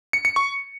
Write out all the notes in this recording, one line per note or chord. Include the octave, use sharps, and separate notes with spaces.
C#7
C#7
C#6